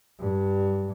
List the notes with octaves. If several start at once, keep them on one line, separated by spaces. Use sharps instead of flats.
G2